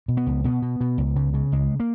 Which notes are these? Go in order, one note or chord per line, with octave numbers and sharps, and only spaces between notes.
B2
B3
C#2
B2 B3
B2
B2
C#2
C#3
C#3
C#2 G#3
A#3